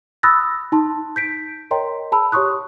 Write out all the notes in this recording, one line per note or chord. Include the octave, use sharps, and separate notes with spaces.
B5 D#6 E6 F#6 A6 A#6
D#4 A5 C6
G6 B6 D7
A#4 C#5 D#5 G5 A#5 C6
G#4 A5 B5 E6
G4 C#5 C6 C#6 D#6 F#6